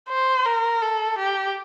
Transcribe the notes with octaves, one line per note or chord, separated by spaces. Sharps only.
C5
A#4
A4
G4